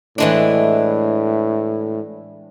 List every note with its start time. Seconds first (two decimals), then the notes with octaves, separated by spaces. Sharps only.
0.18 A2 E3 G#3 D4